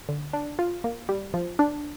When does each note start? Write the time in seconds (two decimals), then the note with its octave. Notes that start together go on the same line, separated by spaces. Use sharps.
0.09 D3
0.33 D4
0.59 F4
0.84 A#3
1.09 G3
1.34 F3
1.59 D4